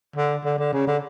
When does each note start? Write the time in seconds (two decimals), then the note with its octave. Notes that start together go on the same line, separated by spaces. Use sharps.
0.16 D3
0.44 D3
0.59 D3
0.73 C#3
0.87 D3